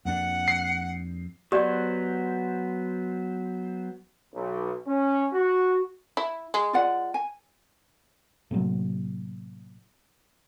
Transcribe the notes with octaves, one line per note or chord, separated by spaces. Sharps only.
F2 A#3 D4 F#5
C7
F#3 B3 G4 C5 D5
B1
C#4
F#4
E4
G#3
F4 D5 F#5
G#5
A2 C3 F#3 A#3